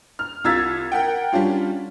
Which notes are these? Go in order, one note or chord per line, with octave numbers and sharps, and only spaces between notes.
F6
C2 F4 E6 G#6 A6 B6
A#4 F#5 G5
G3 C#4 D4 F4